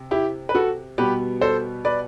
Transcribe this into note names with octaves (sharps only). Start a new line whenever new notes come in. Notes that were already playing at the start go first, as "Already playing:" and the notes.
Already playing: C3
E4 G4
B4
F#4 A4
B2 G3 B3 G4 B4
A4 C5
B4 D5